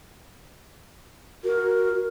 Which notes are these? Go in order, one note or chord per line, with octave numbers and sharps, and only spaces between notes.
F#4 A#4